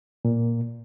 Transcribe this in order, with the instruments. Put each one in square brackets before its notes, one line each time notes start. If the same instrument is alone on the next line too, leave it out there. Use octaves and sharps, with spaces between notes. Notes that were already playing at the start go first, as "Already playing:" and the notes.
[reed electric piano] A#2